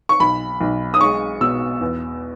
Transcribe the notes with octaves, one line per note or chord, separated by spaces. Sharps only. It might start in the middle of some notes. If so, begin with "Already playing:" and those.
C#6
B1 B5
B1
D#6
G#3 C#6
B2 E6
E2